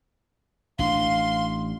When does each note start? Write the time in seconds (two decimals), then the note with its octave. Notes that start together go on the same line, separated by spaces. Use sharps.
0.79 A1 D4 F5 C6